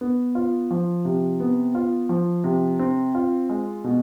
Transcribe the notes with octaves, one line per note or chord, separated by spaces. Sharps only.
B3
F4
F3
C3
B3
F4
F3
C3
C4
F4
G#3
B2